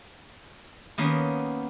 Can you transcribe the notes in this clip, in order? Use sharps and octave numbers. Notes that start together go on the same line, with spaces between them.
D#3 A#3 B3 C#4